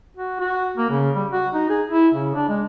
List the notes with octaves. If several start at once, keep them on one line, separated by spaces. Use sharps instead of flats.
F#4
F#4
A#3
C#3
G3
F#4
D#4
G#4
E4
C#3
D4
G#3